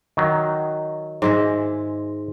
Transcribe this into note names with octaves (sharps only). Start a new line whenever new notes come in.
D#3 F#3
G#2 G#3 E5